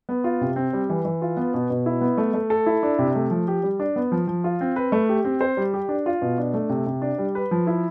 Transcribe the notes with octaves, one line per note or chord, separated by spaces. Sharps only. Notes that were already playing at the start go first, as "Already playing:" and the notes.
B3
F4
C3
C4
G3
E3
E3
F4
B3
B2
B2
E4
B3
A3
A3
A4
E4
D4
C3
A3
F3
G4
G3
D4
B3
F3
F3
F4
C4
B4
A3
G4
C4
C5
G3
G4
D4
F4
B2
D4
A3
C3
C3
D4
G3
B4
F3
E4